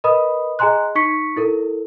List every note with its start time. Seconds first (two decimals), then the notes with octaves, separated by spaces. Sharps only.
0.04 A#4 B4 D#5 B5 D#6
0.59 G#4 D#5 G#5 A#5 C6 F#6
0.95 D#4 C#6 B6 C#7
1.36 E4 A4 A#4